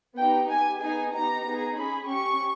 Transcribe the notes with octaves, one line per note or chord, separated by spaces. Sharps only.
B3 D#4 G4 G5
B3 G4 G#5
B3 D#4 G#4 G#5
B3 D#4 G4 A#5
B3 D#4 G#4
C#4 G#4 B5
C#4 G4 C#6